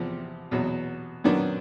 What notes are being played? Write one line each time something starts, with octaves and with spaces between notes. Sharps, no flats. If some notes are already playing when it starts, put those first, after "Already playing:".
Already playing: E2 C3 F3
E2 B2 F#3
F#2 D#3 F#3 B3 D4